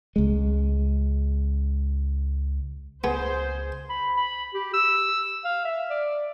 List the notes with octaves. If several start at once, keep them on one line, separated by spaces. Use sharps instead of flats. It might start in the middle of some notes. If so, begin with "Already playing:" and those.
C#2 G#3
C#2 B3 G#4 C5
B5
B5
G4
E6
F5
E5
D5